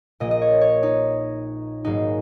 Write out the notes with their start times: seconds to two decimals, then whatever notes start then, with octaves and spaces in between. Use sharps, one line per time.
0.20 A#1 A#2 A#3 D#5
0.31 D#5
0.42 C#5
0.61 C#5
0.83 D#4
1.85 G#1 G#2 F#3 A#3 D#4